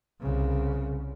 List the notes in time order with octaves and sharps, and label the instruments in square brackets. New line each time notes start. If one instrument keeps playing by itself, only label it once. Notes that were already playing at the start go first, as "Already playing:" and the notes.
[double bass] C2 C#3